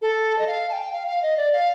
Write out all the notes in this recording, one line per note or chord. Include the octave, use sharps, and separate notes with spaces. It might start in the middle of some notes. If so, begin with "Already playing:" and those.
A4
D#5
F5
A5
G5
F5
F5
D#5
D5
F5